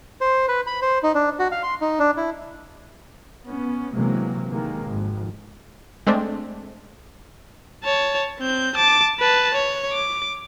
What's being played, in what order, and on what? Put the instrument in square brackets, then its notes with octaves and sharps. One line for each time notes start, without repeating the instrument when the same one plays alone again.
[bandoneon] C5
B4
B5
C5
D#4
D4
F#4
F5
C6
D#4
D4
E4
[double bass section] B3 C#4
C3 E3 F#3 G#3 A#3
C3 D#3 G#3 A#3
G#1 F2
[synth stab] G#3 A3 C4 D4
[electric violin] C#5 A5
C4 G6
A5 D6
B4 A5
C#5
D6